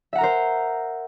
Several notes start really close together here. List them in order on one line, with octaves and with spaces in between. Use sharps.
E5 F#5 A#5 A#4 C5